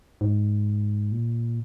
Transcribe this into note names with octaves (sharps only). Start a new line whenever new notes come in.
G#2
A#2